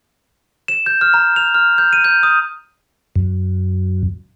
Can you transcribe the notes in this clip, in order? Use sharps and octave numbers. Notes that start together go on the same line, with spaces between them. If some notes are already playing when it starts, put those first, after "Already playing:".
E7
G6
F6
A#5
F7
F6
G6
D#7
G6
D#6
F#2